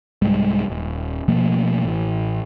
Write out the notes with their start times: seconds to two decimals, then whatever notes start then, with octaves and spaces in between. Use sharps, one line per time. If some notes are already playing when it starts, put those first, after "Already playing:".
0.22 C2 G#2 G3 G#3
0.70 D#1
1.28 B2 F3 A3 A#3
1.84 A1